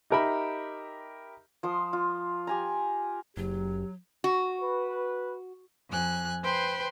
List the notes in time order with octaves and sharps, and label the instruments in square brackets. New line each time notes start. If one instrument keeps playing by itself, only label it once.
[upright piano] D#4 G4 A#4 E5 B5
[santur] F3 C6 D#6
F4
G4 G#5 A#5
[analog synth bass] F#1 [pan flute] F#3 [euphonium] G4
[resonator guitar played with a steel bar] F#4
[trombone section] B4
[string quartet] F2 G#5 F#6
B4 C5 G5 C6